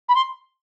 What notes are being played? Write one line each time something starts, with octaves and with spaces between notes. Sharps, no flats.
B5
C6